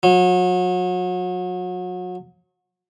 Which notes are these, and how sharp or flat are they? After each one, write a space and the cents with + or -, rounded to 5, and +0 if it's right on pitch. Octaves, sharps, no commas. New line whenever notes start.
F#3 -35